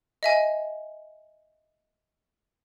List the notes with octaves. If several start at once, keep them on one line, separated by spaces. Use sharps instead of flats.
D#5 E5 G#5